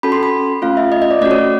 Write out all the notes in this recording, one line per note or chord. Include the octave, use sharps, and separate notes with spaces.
C#4 F#4 A4 B5
C6
B5
A3 C#4 F4 F5
E5
D#5
D#5
D5
A3 C#4 F#4 D5
C#5